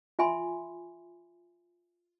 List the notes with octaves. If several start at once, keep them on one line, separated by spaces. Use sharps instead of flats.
F4 E5 G#5 B5 C6